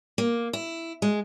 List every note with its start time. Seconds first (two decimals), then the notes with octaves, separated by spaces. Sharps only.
0.18 A#3
0.53 E4
1.02 G#3